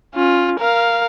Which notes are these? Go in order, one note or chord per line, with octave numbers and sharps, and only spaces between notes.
C#4 F4
A#4 F5